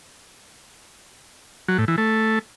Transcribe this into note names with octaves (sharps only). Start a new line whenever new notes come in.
F#3
A2
E3
A3